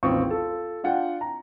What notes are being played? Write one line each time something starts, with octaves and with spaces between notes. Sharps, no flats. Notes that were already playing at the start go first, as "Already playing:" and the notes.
A1 D#2 C4 F4 C#6 D#6
F4 A4
D4 F4 F#5 G5
A#5